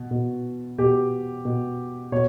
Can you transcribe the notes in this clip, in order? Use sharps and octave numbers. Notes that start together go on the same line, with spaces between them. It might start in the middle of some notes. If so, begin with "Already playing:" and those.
Already playing: B2
B2
B2 G4
B2
B2 C#5